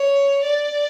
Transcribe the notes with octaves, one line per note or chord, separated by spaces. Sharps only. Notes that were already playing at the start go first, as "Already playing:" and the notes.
Already playing: C#5
D5